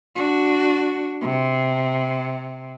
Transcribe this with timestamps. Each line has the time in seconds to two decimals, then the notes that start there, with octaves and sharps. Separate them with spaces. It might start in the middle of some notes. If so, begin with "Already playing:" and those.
0.16 D4 F#4
1.22 C3